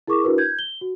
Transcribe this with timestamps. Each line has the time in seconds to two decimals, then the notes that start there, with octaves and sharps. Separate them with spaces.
0.07 E4 G#4 A#4 C#6 D6
0.24 D4 E4 F#4 A#4 B4
0.38 G6 G#6
0.59 G7
0.81 F#4